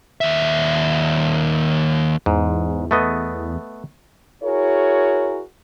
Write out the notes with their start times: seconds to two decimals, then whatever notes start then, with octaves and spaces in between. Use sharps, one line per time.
0.21 D#2 E5
2.26 E2 G#2
2.91 A3 B3 D#5
4.43 E4 F#4 G#4 A#4 C#5